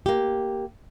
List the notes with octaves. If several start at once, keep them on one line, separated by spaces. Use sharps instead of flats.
A#3 G4